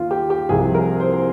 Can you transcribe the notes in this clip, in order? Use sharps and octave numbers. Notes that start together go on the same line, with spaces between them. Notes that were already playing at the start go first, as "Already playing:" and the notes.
Already playing: D#2 D#3 F4
G4
G4
C2 C3 F3 G#4
A#4
C5